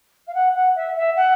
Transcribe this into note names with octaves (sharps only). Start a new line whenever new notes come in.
F5
F#5
F#5
E5
E5
F#5